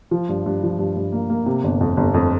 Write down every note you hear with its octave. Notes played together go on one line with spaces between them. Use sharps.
F3
G2
G2
F3
G2
G2
A#3
A#3
C3
G1
F2
G1
F2